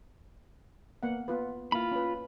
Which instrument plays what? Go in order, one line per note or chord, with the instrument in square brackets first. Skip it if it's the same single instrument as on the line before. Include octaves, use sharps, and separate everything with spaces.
[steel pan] A#3 B3 F#5
B3 F4 B4
[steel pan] A#3 E4 [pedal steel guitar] F4 B5
[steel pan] C#4 B4